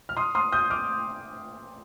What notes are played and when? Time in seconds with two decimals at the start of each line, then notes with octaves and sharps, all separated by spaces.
0.09 F6
0.17 C6 D#6
0.35 C6 D#6
0.52 D#6 G6
0.70 D6 F6